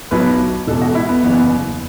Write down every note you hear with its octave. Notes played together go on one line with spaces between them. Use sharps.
B1 B2 F#3 B4
E1 E2 B2 A4
F#4
E4
B3
F#1 E2 C#3 B3